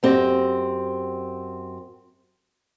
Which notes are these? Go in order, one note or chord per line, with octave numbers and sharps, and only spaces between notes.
F#2 C4 G4 D#5